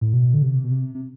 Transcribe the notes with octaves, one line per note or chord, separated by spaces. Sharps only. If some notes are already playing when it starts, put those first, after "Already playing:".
A2
B2
D3
C3
B2
C3
C3